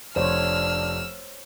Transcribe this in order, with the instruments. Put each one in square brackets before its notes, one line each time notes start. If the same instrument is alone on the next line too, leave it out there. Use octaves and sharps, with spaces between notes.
[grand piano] F1 [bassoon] D4 [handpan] C5 C#5 [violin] E6 F6